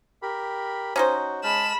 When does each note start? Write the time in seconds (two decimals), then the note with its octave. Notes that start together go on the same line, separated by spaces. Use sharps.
0.22 G4 A#4 B5
0.96 C#4 D#4 F#4 C5
1.44 G#3 A5 B5 F6 E7